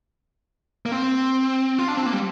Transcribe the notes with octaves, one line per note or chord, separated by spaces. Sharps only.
A#3
C4
F4
D4
C4
A#3
G3